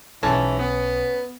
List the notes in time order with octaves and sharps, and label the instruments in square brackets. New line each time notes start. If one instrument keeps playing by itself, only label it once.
[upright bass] B1 D4 [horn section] G#2 B2 E3 [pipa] C#4 E5 A5
[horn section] B3